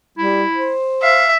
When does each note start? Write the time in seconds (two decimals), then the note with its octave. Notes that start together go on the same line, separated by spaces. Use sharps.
0.18 G3 E4
0.54 C5
1.02 E5 F5